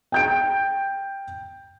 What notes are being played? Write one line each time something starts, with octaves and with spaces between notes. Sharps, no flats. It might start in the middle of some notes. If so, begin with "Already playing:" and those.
G5 G6 D7